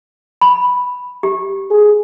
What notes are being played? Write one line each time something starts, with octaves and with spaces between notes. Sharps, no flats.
B5
G4
G#4